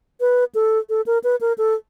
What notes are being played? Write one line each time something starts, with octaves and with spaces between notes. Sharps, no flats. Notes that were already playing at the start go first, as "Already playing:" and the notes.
B4
A4
A4
A#4
B4
A#4
A4